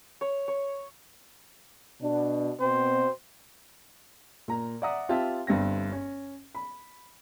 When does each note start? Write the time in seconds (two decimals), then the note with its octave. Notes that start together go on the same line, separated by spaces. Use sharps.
0.21 C#5
0.48 C#5
2.01 B2 D4
2.60 B2 C4 C5
4.48 A#2 A#5
4.82 D5 E5 F#5 A#5 D#6
5.09 C4 F4 G4 E5 G5 A5
5.47 G1 G2 C4 A#6
5.92 C#4
6.55 B5